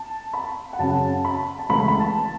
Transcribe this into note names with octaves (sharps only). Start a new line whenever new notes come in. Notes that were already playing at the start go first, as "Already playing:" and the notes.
Already playing: A5
B5
F#5
F#2 C#3 F#3 C#4 A5
B5
A5
C#2 C#3 E3 A3 E4 B5
B5
A5